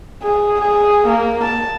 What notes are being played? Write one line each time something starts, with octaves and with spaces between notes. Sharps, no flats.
G#4
G#4
A#3
A5